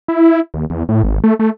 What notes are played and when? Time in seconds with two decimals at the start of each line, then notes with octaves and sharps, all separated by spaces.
0.08 E4
0.54 D#2
0.70 E2
0.89 A2
1.03 G#1
1.24 A3
1.39 A3